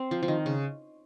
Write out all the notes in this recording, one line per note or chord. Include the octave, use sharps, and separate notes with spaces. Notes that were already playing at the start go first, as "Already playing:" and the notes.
Already playing: C4
F3
F3
D#3
C#3